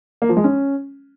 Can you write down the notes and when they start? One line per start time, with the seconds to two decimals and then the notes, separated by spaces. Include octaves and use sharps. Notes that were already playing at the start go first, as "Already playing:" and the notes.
0.22 A#3
0.29 F3
0.37 G#3
0.44 C#4